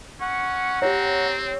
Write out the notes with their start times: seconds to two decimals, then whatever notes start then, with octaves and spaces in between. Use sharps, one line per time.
0.21 C#4 F#5 C#6
0.82 C4 G4 C#5 A#5